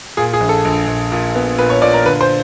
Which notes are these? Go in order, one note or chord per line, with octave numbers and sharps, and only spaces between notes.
A#2 G#4
G#4
A#1
A4
A#1
A#1
A#2
B3
A#2 B4
C#5
A#2 D5
A#4
D3 B4
C5